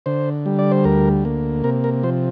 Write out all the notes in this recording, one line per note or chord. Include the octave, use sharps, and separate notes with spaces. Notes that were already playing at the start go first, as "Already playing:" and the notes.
D3 C5
G3
D5
C5
D2 A#4
A#3
C3 A#4
A#4
F3 C5